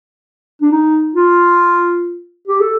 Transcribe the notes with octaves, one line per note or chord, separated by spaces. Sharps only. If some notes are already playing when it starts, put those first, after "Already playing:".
D4
D#4
F4
G4
A4